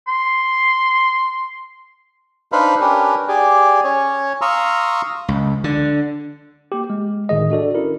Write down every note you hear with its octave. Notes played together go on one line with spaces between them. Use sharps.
C6
D4 D#4 B4 C5 F5 B5
C#4 D4 G4 A#4 B4
G4 G#4 D5
C#4 C#5
F5 A#5 C6 C#6 D#6 E6
C#2
D3
A#3 G4
G#3
G1 A2 D#3 G#4 D#5
D4 F#4 A4 D5
C#4 E4 A#4